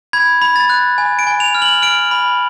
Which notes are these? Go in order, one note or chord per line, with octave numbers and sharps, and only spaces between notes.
B5 G#6
B5
A6
F#6
G#5
D7
G#5
F7
F6
F#7
F6 D7
B5